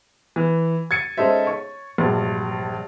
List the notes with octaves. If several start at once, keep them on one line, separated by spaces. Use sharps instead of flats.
E3
G#6 A6 C#7 D#7
G#3 C#4 D#4 A4 C5 E5
C#5 C#6
A#1 G2 C3 F#3